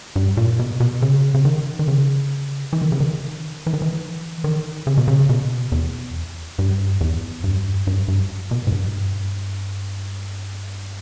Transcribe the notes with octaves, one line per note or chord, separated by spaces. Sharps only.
G2
A#2
B2
B2
C#3
C#3
D#3
D#3
C#3
E3
D#3
C#3
D#3
E3
D#3
E3
D#3
C#3
B2
C#3
B2
E2
G2
E2
G2
G2
G2
B2
G#2
G2